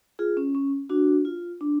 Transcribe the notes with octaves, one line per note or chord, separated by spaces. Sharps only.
F4 G#4
C#4
C#4
D4 F#4
F4
D4